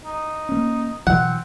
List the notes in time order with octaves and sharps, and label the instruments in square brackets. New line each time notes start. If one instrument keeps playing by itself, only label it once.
[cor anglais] D#4
[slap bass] A#3 C#4
[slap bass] B2 E3 F#3 [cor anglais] C4 [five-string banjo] F#5